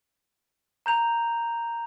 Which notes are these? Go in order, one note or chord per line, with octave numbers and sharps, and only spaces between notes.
A#5 G6 F7